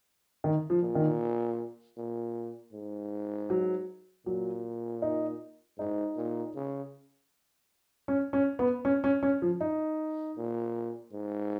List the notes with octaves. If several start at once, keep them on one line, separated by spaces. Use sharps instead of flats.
D#3
F3
A#2
D#3
A#2
G#2
F#3
A#2 F#3
D#4
G#2 D#4
A#2
C#3
C#4
C#4
B3
C#4
C#4
C#4
F3
D#4
A#2
G#2